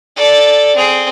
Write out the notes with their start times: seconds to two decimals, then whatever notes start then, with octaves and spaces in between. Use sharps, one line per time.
0.16 A4 D5
0.75 C4 G#4